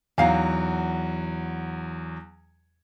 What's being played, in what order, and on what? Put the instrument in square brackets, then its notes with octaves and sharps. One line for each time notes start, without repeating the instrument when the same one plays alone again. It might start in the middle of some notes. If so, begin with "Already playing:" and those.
[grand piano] E2 F#3 [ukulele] D#4 F5 G#5